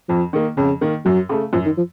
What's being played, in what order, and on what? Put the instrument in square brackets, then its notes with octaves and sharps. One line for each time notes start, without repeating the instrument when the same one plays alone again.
[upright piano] F2 [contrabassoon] F3
[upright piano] D#3 A#3
[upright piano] F2 [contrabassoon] C#3
[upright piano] D#3 A#3
[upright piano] F#2 [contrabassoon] F#3
[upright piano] C#3 A3
[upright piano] F#2 [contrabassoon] F3
[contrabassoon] D#3
F3